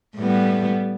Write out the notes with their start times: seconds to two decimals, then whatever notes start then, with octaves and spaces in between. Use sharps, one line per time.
0.17 A2 G3 B3